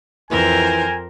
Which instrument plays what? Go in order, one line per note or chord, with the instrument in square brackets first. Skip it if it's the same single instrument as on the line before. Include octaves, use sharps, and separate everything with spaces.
[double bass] F2 [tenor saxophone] E3 [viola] A#4 C5 [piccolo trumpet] G#5